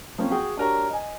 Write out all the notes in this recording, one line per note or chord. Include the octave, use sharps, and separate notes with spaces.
F3 A#3 C4 C#4
F#4 G#4 G5
D4 F#4 G4 A#4 C#5
D#5 G#5